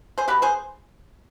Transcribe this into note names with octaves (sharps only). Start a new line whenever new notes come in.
G#4 C5
B2 B3 G4 B4
G#4 C5